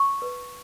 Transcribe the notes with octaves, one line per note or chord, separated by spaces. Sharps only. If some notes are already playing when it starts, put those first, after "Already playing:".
Already playing: C#6
B4